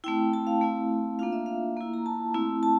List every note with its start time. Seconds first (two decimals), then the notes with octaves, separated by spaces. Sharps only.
0.04 A3 C4 E4 G5
0.33 A5
0.47 F5
0.61 A3 C4 E4
1.19 A#3 D4 F4 F5
1.32 E5
1.46 F5
1.77 A#3 E4
1.94 A#5
2.06 A5
2.34 A3 C4 E4
2.63 A5